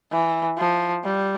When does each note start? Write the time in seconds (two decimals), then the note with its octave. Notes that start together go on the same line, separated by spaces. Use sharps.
0.12 E3
0.58 F3
1.04 G3